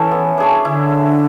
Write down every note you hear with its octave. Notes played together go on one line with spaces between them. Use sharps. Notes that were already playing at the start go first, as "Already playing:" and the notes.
Already playing: E3 C#4 E4 A4
B3
D4 G#4 C#5
D3 E4